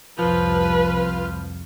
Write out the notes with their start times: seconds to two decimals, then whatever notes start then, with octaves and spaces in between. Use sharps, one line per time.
0.19 C2 F2 F3 F4 B4